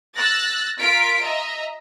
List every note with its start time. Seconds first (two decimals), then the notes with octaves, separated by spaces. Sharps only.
0.15 E6 F#6 A6 A#6
0.79 F4 A#4 F5 B6 D7
1.22 D#5 E5 A#5